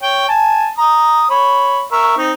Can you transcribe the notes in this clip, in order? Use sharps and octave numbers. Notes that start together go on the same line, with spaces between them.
C#5 G5
G#5 A5
A#5 D#6
C#5 B5
A#4 E5 C#6
C4 D#4